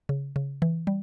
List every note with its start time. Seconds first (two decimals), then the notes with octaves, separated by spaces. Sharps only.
0.09 C#3
0.36 C#3
0.62 E3
0.87 G3